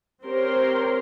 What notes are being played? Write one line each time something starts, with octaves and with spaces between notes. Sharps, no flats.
C4 G4 A#4 C5 C#5 C6